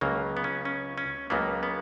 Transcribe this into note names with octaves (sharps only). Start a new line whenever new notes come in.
C#2 C#3 F#3 A#3
B3
C#4
C#4
C#4
C#2 C#3 F#3 A#3 B3
B3